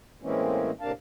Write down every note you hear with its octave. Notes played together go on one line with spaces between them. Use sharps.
A2 E3 G#3 A#3 C4 C#4
A2 C3 A#3 D4 F5 A5